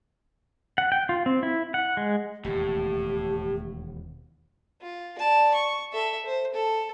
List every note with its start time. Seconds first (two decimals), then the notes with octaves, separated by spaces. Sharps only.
0.78 F#5
0.92 G5
1.09 F4
1.26 C4
1.43 E4
1.74 F#5
1.97 G#3
2.44 E1 D#2 A2 G4
4.81 F4
5.18 D5 A5
5.55 C#6
5.92 A4 E5
6.26 C5
6.54 A4